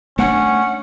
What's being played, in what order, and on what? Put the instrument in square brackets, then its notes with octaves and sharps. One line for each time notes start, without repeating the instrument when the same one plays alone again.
[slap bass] A3 A#3 D4 [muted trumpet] C#4 [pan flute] F#5